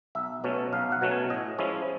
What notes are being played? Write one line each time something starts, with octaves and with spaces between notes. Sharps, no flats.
B1 E5
B2 F#3 A3 C#4
B1 F5
F#5
B2 F#3 A3 C#4
G#5
A2 D#5
F3 G#3 C#4 E4